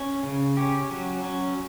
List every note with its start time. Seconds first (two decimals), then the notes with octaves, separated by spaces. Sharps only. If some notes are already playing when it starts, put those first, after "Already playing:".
Already playing: C#4
0.23 C#3
0.57 C#4 G4
0.91 F#3
1.24 C#4